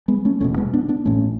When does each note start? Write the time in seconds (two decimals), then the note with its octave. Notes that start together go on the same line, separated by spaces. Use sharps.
0.08 G#3 B3
0.25 A3 C#4
0.40 E1 E2 B2 A3 C#4
0.56 G#3 B3
0.74 B3 D4
0.89 B3 D4
1.05 A1 A2 A3 C#4